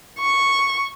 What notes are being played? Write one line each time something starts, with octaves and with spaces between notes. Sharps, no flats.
C#6